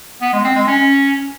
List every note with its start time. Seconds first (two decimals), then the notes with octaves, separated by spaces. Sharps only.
0.21 B3
0.33 G#3
0.44 C4
0.56 G#3
0.67 C#4